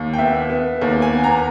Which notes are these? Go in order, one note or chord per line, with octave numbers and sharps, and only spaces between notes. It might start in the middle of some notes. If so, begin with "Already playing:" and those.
Already playing: D#2
G5
B3 E5
B3
D#2
G#5
B3
A#5